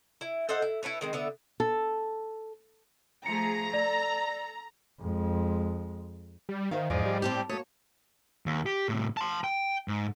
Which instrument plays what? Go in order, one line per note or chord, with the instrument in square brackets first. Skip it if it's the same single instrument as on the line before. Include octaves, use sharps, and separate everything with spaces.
[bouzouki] E4
A4 C5 D#5 F#5
E4
E4 A4 B4 C#5
D#3 G#3 C4
D3 B3 E5
[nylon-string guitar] A4
[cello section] F3 A3 G#4 [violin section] A#5 [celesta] C#7
[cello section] A4 [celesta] D5
[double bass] F2 G#3
[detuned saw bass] G3
[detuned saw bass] D#3 [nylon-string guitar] C5 E5 F5
[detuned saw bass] E2 [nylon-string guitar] G#2 D#5 [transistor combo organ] F3 G#3 D5
[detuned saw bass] G3
[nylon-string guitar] A2 [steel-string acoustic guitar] C4 D4 G4 [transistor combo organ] G5
[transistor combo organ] A3 D#6 [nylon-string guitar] A#3 F#4 [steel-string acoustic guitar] C#5
[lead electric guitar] D#2
G4
A2 C3
A5 C6
G5
G#2